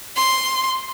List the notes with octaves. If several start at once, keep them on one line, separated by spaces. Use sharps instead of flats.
C6